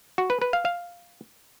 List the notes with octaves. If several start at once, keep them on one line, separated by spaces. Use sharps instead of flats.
F#4
B4
B4
F5
F5